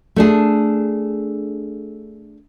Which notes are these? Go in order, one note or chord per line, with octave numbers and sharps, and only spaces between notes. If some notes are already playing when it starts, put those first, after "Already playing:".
A3 D4 G#4